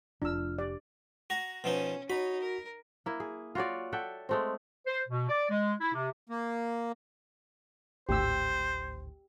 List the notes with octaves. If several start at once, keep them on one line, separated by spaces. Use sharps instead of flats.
F1 D4 F4 E6 F6
G4 D5
F#4 A#5
B2 F3 C#4 D#4
D#4 F#4 C#5 B5
A#4
A#3 E4
G#4
F4 F#4 C#5 D5
A4 E5 F#5 G5
G#3 A3 C4
C5
B2
D5
G#3
E4
C3
A#3
G#1 D2 A2 G4 C5 E6